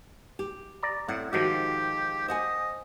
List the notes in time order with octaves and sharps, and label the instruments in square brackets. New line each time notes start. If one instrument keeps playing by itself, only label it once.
[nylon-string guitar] G4
[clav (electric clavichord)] D5 A#5
[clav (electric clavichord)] A2 [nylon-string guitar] C4 F#5
[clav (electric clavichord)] G#2 D#3 F3 [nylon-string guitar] F#4 G5 [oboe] G4
[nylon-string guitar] C5 F#5 G#5 [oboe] D#5